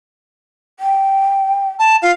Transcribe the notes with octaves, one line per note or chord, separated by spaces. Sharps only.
G5
A5
F4 F5